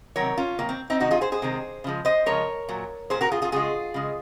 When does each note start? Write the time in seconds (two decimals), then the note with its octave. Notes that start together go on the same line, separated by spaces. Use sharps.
0.16 C3 D#3 F#3 A#4 C#5
0.37 C#4 F4
0.59 C3 D#3 F#3 A#3
0.69 C4
0.90 C4 D#4
1.00 C3 D#3 G#3 D#4 F#4
1.11 F4 G#4
1.21 G#4 C5
1.32 G#4 C5
1.42 C3 D#3 G#3
1.84 C#3 F3 G#3
2.05 C5 D#5
2.26 C#3 F3 G#3 A#4 C#5
2.69 A#2 F#3
3.10 A#2 F#3 G#4 C5
3.21 F#4 A#4
3.31 F4 G#4
3.42 F4 G#4
3.52 C#3 G#3 F4 G#4
3.94 C#3 G#3